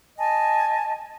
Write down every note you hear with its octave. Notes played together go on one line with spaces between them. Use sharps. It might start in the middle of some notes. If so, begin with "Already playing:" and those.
D#5 G#5 A5